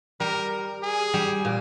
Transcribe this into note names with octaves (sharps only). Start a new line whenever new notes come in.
G3 A#4
G#4
G3
A#2